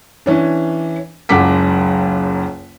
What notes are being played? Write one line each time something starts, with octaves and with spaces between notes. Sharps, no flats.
E3 C#4 D4
F#1 C#2 F#2 F#5 D6 B6